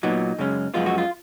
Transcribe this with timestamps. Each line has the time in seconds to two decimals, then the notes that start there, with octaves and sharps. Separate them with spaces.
0.03 A#2 F#3 B3 D#4
0.38 F#2 C#3 G#3 C#4
0.74 F#2 F3 G#3 B3 F4
0.86 F#4
0.98 F4